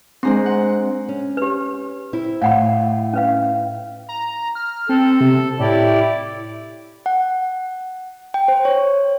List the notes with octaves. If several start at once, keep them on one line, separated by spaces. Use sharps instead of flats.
G#3 C4 D4 C5 A#5 C6
F#5
C#4
G4 B4
C4 E4
A2 F5 F#5 B5
C#4 B4 F5
A#5
F6
C4 A4
C3
A2 E4 G4 D5
F#5
G5
C5
C#5